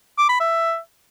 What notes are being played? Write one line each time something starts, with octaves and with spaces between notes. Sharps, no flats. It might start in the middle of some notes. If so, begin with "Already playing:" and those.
D6
B5
E5